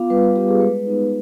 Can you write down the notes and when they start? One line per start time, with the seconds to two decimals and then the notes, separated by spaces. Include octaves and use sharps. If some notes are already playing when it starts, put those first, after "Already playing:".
Already playing: B3 F4 F5 D6
0.10 G3 B4
0.23 B4
0.36 B3 F4 G4
0.48 G#4
0.61 G#3 B4
0.87 B3 D#4